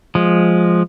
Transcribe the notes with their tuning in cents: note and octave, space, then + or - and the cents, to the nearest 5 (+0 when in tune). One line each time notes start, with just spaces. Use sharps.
F3 +5 G#3 +0